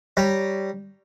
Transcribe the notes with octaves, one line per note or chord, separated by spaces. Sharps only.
G3 C#5 A#5